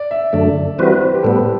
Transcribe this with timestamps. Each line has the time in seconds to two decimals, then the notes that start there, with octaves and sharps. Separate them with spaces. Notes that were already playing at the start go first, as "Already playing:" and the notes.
Already playing: D5
0.11 E5
0.33 F#2 D3 A3 D5
0.78 E3 G3 C4 F#4 B4 C5
1.01 B4
1.14 G4
1.23 A2 G3 B3 A4